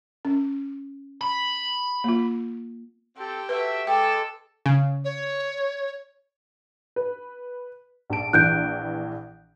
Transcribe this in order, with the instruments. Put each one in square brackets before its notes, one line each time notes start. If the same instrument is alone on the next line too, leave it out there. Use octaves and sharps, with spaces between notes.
[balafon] C#4
[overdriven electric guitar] B5
[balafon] A#3 F4
[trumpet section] C4 A4 [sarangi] G4
[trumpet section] F#4 A4 E5 [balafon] B4
[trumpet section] G#3 D6 [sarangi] A4 [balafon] G5
[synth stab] C#3
[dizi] C#5
[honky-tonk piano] B4
A#1 A5 D7
[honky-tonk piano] A#1 E3 [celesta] F#6 G6 D7